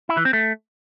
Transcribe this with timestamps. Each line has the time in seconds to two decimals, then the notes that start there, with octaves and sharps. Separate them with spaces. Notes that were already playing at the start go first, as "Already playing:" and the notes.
0.09 E4
0.17 E3
0.25 C4
0.33 A3